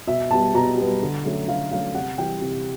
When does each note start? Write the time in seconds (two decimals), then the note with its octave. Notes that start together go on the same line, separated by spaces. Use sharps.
0.07 B2 E5
0.31 G3 B3 A5
0.54 B2 A#5
0.77 G3 B3
1.02 D3
1.24 F#3 A3 C#4
1.48 D3 F5
1.71 F#3 A3 C#4 F5
1.94 C3 F#5
2.18 E3 G3 G5
2.41 C3